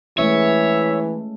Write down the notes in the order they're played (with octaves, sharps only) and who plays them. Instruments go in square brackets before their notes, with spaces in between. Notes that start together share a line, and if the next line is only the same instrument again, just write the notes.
[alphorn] E3 [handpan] G#3 A3 C#4 [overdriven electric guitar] C#5 [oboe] E5